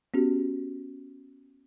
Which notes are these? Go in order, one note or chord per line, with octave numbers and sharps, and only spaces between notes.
B3 C#4 F#4 G4